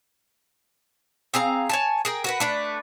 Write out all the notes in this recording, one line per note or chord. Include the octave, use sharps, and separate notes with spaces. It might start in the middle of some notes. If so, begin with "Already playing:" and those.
C4 G#4 F5 A#5
C#5 G#5 A5
G#4 A#4 G5
F#4 A#4 B4
A3 D4 B4